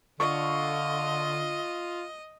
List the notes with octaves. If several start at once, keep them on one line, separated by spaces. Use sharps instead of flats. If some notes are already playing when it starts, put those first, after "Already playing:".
D3 F4 D#5 C#6